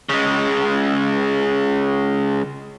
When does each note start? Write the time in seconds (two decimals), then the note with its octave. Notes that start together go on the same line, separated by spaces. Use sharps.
0.09 C#3 G#3